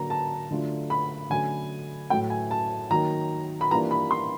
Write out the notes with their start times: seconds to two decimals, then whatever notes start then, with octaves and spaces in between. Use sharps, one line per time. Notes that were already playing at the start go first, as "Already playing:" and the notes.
Already playing: D3 F#3 A#3 A#5
0.10 A5
0.51 D3 F#3 A3 D4 F4
0.90 B5
1.30 D3 F#3 A3 C#4 G#5
2.10 A2 F#3 A3 G5
2.30 G#5
2.51 A5
2.91 D#3 F#3 A#3 D#4 A#5
3.61 B5
3.71 E3 G3 A#3 D4 F4 A#5
3.91 B5
4.11 C6